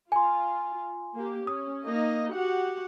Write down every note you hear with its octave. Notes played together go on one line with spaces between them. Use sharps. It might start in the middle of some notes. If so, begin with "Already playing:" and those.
F4 G#5 C6
A#3 G4
C#4 D#6
A#3 D#4 D#5
F#4 G4 F#5